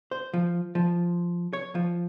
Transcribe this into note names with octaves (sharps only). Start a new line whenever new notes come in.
C5
F3
F3
C#5
F3